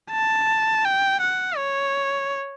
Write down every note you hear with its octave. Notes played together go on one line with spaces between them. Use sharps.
A5
G5
F#5
C#5